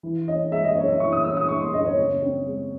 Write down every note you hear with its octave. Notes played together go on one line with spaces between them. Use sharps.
E3
C#4 D#5
G#3 E5
D#5
F#2 C#5
E5
E3 C#6
D#6
C#4 E6
D#6
G#3 C#6
C6
F#2 D#5
C#5
C#3
C4
G#3